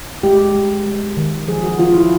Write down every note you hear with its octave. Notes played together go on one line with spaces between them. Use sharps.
G#3 G4
G#3
G#3
D#3
F3 G#4
F#4
F3 F4
E4